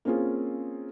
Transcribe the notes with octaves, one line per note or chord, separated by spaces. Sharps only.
A#3 C4 C#4 F4 G#4